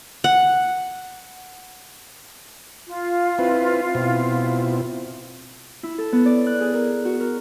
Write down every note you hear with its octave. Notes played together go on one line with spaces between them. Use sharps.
F#5
F4
C4 E4 B4
B2 C4 E4
E4
A4
B3
D5
F#6
G#4
A#4
F#4
A#4